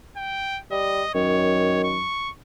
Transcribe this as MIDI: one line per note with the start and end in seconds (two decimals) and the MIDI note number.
0.17 0.60 79
0.71 1.03 55
0.71 1.10 75
1.15 2.05 42
1.15 1.97 51
1.15 1.81 73
1.84 2.31 85